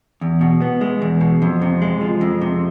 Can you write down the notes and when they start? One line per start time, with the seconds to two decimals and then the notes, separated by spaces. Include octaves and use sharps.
0.21 E2
0.41 B2
0.62 B3
0.81 G#3
1.02 E2
1.21 B2
1.42 F2
1.62 C3
1.82 G#3
2.01 F3
2.21 F2
2.41 C3